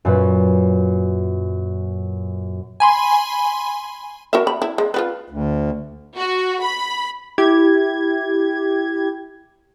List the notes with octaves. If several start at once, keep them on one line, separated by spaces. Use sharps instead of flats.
F#2 A#2 B4
G#5 B5 C6
F#4 A#4 E5
B5
E4
G#3
F4 F#4 B4
D2
F#4
B5
E4 G4 G#6